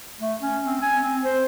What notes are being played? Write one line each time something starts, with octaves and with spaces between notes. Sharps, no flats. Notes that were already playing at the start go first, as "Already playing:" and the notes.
A3
C#4
C4
G#5
C4
C5